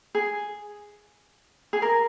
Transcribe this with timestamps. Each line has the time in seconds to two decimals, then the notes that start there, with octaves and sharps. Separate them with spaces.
0.15 G#4
1.73 G#4
1.82 A#4